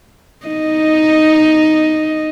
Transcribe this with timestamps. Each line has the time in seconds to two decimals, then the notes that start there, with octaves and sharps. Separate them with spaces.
0.46 D#4 D#5